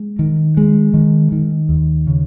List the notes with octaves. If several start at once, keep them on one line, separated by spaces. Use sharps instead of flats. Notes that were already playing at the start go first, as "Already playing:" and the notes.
Already playing: G#3
D#3
G#3
D#3
D#3
D#2
C#3